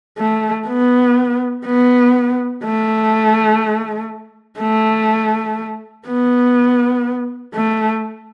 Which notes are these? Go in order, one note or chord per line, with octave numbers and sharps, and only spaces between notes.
A3
B3
B3
A3
A3
B3
A3